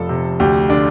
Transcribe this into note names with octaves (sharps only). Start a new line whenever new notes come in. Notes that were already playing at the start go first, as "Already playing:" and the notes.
Already playing: F1 F2 A4
C3
D2 G4
D3 D4